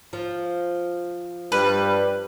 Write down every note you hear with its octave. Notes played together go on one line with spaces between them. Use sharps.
F3
G2 G3 B4